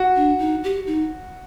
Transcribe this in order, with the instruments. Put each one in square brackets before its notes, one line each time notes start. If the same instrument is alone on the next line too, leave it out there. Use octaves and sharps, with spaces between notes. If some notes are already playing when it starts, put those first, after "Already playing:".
Already playing: [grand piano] F#4
[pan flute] D4
D#4
G4
D#4